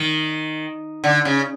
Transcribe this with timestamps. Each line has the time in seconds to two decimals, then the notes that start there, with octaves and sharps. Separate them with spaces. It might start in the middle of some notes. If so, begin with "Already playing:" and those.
Already playing: D#3
1.04 D3
1.25 C#3